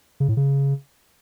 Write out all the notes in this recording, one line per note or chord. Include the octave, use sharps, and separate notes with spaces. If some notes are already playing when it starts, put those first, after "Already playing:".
C#3
A2
C#3